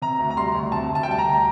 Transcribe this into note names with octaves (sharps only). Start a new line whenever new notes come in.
C3 A#5
D2
A#5
G3 C6
D2
C3 A5
D2
A5
G5
G3 A5
A#5
D2